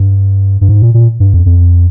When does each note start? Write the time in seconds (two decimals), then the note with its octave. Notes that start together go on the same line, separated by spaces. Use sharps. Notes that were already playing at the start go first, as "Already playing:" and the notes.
Already playing: G2
0.61 G2
0.69 G#2
0.82 A#2
0.94 A#2
1.20 G2
1.34 F2
1.46 F2